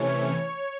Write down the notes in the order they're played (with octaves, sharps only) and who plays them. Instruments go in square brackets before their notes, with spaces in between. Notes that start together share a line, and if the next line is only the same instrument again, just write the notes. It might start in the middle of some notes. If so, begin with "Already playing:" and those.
Already playing: [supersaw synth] C3 E3 A3 C#4 C#5